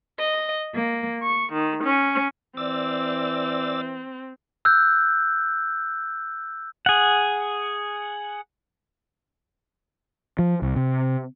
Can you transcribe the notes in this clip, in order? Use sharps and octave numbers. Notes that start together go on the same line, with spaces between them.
D#5
A#3
C#6
D#3
C#4
E3 C4 D5 E6 A6
E6 F#6 G6
G#4 F#5
F3
C2
C3